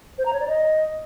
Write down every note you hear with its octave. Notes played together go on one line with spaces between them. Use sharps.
C5
A#5
C#5
D5
D#5